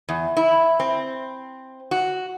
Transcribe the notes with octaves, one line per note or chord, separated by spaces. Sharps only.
E2
E4
C4
F#4